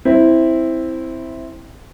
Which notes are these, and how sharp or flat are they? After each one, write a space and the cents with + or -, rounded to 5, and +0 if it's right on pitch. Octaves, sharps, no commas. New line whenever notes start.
C4 +0 E4 -5